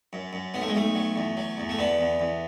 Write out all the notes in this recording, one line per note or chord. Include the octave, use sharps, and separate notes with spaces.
F#2
F#2
B1 B3
A3
G#3
B1 A3
F#3
E2
F#3
E2
A3
D3 B3
E2
E2